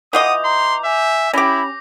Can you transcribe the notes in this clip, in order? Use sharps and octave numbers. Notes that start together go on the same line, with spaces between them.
E3 F4 D#5 F#5 D6 D#6 G6 F7
A#5 C6
E5 G#5
C#4 E4 G4 B5 D6 A#6